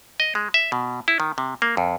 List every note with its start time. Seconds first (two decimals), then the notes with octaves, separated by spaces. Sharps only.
0.20 D#5
0.35 G#3
0.54 E5
0.72 B2
1.08 E4
1.20 D#3
1.38 C3
1.62 A#3
1.77 F2